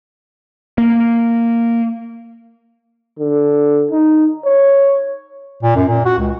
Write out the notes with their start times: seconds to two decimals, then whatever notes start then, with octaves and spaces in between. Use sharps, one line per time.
0.78 A#3
3.19 D3
3.91 D#4
4.45 C#5
5.63 A#2
5.76 F#2
5.88 A#2
6.05 F#4
6.19 C#2